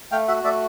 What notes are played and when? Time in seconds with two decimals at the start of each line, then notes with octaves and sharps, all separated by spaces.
0.12 A3 F5 G5
0.28 F#4 E5 F#5
0.44 A3 D5 E5